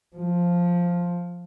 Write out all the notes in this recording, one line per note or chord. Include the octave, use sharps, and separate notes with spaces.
F3